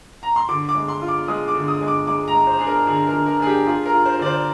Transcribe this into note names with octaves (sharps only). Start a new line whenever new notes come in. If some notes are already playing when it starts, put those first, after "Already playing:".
A#5
C6
D3 D6
D6
G#3
C6
F4
D6
G#3 D#6
D6
D3
D#6
G#3
D6
G#3 D6
A#5
G#3
C5
D4 G#4
A#4
D3 G#4
A#4
D3
A#4
D4 G#4
G4
F4 G#4
A#4
F4
C5
D3 D5
C5